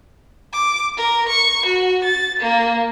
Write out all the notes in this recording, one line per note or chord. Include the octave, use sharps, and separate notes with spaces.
D6
A#4
C#6
F#4
A6
A#3